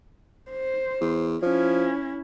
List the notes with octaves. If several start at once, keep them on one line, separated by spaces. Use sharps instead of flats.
C5
E2
F3 C#4 E4